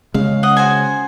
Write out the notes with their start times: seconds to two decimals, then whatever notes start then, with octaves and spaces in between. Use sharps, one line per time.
0.14 C#3 G#3 F5
0.43 D#5 F#5
0.57 F#4 C5 G#5